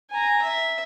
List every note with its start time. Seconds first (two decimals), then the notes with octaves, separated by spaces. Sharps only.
0.11 G#5 A#5
0.42 E5